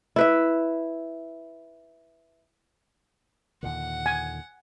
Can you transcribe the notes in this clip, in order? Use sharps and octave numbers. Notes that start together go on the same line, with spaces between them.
E4 B4 E5
D#2 A#2 D3 F#5
G#5